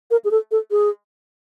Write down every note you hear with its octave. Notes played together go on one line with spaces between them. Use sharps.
A#4
G#4
A4
A4
G#4